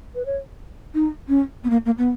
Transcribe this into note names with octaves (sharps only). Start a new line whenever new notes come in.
B4
C#5
D#4
C#4
B3
A#3
A#3
B3